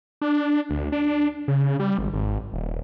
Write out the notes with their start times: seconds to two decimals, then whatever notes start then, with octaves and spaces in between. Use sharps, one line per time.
0.21 D4
0.70 D2
0.92 D4
1.48 C#3
1.80 G3
1.98 G#1
2.14 G#1
2.53 D#1